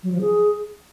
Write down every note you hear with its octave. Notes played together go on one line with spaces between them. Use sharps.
F#3
F3
G#4